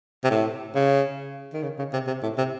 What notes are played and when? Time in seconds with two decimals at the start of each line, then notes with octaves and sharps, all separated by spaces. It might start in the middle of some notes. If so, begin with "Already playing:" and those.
0.24 C3
0.31 A2
0.75 C#3
1.54 D#3
1.63 C#3
1.79 C#3
1.93 C3
2.07 C3
2.23 A2
2.38 C3